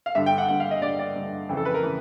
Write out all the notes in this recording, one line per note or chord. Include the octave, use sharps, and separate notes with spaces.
F5
G2 D3 E5
G5
F#5
G2 D3 F#5
F5
D#5
G2 D3 D5
D5
G2 D3
F2 C#3 E3
A4
B4
A#4
C#3 E3